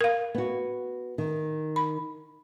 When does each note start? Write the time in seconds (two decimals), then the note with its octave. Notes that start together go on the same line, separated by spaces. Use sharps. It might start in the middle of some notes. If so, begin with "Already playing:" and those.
0.01 A#4 F5
0.35 B3 F#4
1.18 D#3
1.76 B5